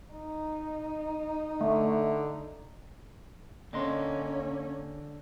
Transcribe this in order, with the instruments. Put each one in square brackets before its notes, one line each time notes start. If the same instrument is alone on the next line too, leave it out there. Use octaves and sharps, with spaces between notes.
[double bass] D#4
[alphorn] D3 [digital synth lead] A3
[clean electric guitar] D3 D#5 C6 [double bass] A#3 C#4